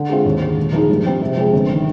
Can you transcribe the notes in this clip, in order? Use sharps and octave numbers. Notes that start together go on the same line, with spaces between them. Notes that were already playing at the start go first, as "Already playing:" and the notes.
Already playing: D3
G#3 C4 F4
D#2
D3 G#3
A#2
F3 A#3 D#4 G#4
G2
F3 C4 G4
C3
F3 G#3 C4
G1
D#3